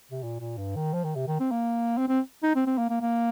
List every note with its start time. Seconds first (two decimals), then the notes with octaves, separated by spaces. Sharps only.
0.11 C3
0.23 A#2
0.40 A#2
0.58 G2
0.76 D#3
0.94 F3
1.04 D#3
1.15 C3
1.28 D#3
1.40 C4
1.51 A#3
1.98 C4
2.08 C4
2.43 D#4
2.55 C4
2.66 C4
2.78 A#3
2.89 A#3
3.01 A#3